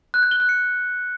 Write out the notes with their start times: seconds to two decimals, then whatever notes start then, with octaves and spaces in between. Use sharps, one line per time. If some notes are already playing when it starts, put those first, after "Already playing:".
0.14 F#6
0.23 G6
0.31 G7
0.40 F#6
0.49 C#7